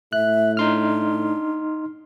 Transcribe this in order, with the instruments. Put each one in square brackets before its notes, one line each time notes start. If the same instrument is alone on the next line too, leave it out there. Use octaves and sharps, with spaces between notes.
[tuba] A2 [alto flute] E5 [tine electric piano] F#6
[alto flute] D4 [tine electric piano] D#4 C6 F6